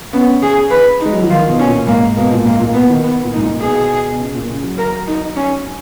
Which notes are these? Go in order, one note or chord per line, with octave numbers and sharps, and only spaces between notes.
B3 C#4
G#4
B4
D#4
G#3
F#3
F3
D#3 F4
B2
C#4
A#2
G#2 A#3
B2 A#3
A#2
G#2 A#3
A#2
B2 B3
D#3
B3
A#2
D#4
G#2
A#2
B2 G#4
B2
C#3
A#2
C#3
F#3
A#4
D#4
C#4